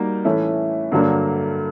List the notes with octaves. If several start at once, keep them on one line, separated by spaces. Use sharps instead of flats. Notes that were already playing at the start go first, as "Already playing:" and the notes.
Already playing: G3 A#3 D#4 F#4 A#4
A2 E3 A3 C#4
G2 D3 F#3 A#3 D4